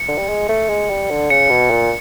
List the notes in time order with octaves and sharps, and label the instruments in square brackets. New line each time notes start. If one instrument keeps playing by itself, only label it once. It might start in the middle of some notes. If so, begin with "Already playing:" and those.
Already playing: [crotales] C#7
[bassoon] D3
G3
G#3
A3
G#3
G3
D3
[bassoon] C#3 [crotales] C#7
[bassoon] B2
A#2